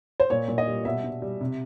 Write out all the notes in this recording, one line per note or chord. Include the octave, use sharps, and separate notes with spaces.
C5
A#2 C#5
A#2
D#5
G3
B2 E5
B2
G3
C3